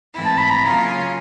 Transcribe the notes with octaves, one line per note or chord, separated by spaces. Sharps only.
G#2 E3 A3 C4 E4
A5
B5
A#5
C#3 F#3 A#3 C#4 F4